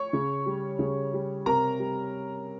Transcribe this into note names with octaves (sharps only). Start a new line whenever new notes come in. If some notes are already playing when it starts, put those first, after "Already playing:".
Already playing: C#5 C#6
C#3
G3
C#3
G3
C3 A#4 A#5
G3